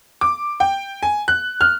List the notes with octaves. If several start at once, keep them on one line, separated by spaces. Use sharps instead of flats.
D6
G5
G#5
F#6
F6